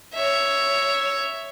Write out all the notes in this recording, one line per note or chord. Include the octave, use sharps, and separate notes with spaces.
C#5 E5